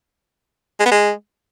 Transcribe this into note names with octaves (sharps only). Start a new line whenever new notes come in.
G#3
B3
G#3